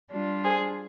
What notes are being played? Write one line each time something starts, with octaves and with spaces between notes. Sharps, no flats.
G3 D4 F4
G#4 C5